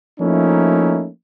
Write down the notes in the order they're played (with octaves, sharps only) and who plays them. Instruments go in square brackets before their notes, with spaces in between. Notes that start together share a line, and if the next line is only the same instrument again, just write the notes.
[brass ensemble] F3 A3 A#3 C#4 D#4 E4